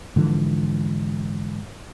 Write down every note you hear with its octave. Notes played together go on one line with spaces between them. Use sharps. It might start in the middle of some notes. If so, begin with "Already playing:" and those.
G#2 D3 E3 F3